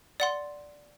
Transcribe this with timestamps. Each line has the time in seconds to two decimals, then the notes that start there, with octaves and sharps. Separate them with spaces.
0.20 D5 F#5 C6